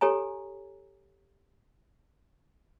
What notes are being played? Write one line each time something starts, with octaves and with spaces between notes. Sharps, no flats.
G4 A4 C#5 G#5 A#5